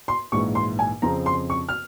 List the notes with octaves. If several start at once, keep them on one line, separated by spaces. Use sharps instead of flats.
C6
A#1 G#2 E3 C#6
C6
G#5
F2 C#3 F3 C4 F4 A#5
C6
C#6
F6